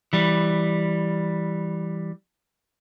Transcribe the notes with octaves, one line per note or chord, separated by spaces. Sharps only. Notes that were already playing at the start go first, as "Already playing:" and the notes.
E3 G3